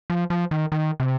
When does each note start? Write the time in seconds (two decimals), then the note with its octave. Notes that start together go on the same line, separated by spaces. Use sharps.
0.10 F3
0.30 F3
0.51 D#3
0.72 D#3
1.00 C3